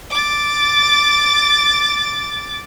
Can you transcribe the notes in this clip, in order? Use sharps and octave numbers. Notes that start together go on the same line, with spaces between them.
D6 A6